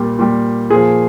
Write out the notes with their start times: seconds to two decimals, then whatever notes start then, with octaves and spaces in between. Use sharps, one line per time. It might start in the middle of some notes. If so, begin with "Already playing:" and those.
Already playing: A#2 G3
0.19 A#2 G3
0.70 A#2 F3 G#4